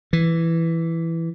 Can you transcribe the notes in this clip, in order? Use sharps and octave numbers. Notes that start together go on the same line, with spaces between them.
E3